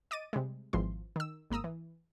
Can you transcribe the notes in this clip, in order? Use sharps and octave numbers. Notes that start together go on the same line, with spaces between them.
D#5 D6 A6 D#7
C3 G3 G#3
G#1 E3 F3 C6
D#3 E6
G#1 A#3 A#5 D#6 E6
E3